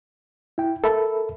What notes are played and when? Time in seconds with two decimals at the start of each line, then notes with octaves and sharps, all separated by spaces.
0.58 E4 G5
0.84 A4 A#4 E5 B5